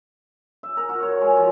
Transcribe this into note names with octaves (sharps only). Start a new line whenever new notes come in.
E5
A#4
F#4
C#5
G#3
F3